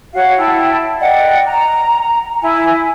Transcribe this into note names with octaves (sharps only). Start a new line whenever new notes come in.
F#4 C#5 F5 F#5
E4 G5 A5
D5 D#5 F#5 G5
A#5
E4 G#5